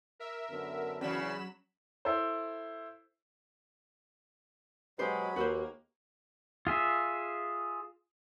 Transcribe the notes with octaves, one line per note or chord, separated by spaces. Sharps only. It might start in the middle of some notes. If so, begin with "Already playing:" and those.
A#4 E5
F#2 D3 B3
E2 C#3 F#3 C#4 D5 B5 E7
E4 A4 C5
B2 F#3 G#3 G4 C5 B5
D#2 A#3 F#4 B4 C5
F4 G#4 E5